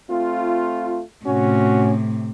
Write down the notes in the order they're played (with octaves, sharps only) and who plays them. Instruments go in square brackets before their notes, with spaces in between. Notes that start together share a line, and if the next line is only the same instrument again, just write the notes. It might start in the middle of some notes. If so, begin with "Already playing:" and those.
[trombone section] A3 C4 F4
[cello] A2 C3 [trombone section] C#4 F#4